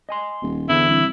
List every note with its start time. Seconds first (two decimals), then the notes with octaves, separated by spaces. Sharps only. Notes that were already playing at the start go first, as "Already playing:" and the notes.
0.09 D#5 G#5 C6
0.42 D#1
0.69 E2 D3 E3 E4
0.88 C2